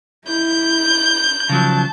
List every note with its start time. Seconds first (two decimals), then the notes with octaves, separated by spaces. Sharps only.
0.27 E4 G6
1.50 C#3 F3 F#3 A5